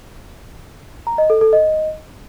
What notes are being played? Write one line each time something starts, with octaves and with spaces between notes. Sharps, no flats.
A#5
D#5
A4
A4
D#5